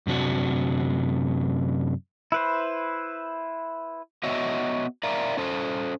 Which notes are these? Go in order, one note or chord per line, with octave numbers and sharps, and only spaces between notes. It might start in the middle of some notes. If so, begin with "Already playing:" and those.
F#2 C3 D4 F#4
E4 B4 C5
B3 F#4 C#5 D#5 E5
A#4 D5 E5 F5 A#5
C#4 A4 C5